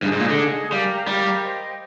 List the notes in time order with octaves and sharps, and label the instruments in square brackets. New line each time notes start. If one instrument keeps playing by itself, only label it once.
[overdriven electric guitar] G2 [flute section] D#4 G#4 D#5
[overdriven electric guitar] G#2
A#2
D3
[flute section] D#4 G#4 D#5
[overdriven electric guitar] G3 [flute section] G4 A#4 F5 A#5
[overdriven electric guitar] G3 [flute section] G4 A#4 F5 A#5
[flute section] C5 D#5 G5